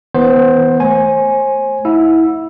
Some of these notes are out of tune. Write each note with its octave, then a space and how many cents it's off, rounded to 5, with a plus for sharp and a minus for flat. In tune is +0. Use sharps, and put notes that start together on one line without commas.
E3 -40 B3 +0 C5 +15
A3 +0 C5 +35 G#5 +0
E4 -20 F#5 -30 E6 +5